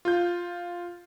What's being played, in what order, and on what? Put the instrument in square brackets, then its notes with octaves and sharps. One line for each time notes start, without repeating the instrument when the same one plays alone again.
[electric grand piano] F4 G6